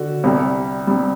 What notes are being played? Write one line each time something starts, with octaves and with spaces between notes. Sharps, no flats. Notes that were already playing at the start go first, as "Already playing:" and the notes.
Already playing: D3 F#4
C2 C3 G3
C3 G3